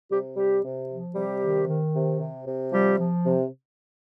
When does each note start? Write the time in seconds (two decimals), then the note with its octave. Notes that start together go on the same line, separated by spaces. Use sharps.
0.11 C3 G3 G4
0.37 C3 G3 G4
0.64 C3
0.89 F3
1.15 C3 G3 G4
1.41 D#3
1.68 D#3
1.94 C3
2.20 C3
2.46 C3
2.72 F3 G3 G4
2.99 F3
3.25 C3